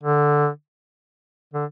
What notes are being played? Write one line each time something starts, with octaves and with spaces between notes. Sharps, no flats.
D3
D3